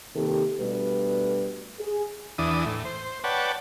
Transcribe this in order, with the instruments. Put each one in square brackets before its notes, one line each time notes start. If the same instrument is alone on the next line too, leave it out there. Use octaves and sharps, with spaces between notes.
[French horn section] C3 D#3 A#3 G4 A4
B2 G3 A3 D4 B4
G#4
[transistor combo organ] E2 E3 D4 D#6
A2
C5
B4 C#5 D5 F#5 G5 A5